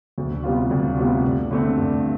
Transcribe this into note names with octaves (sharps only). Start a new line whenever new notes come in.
D2
C3 G3 B3 F4
D2
C3 G3 B3 F4
G2
D3 A3 C4
G2